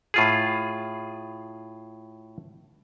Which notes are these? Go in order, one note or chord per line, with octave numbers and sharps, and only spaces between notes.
A2 F4 G#4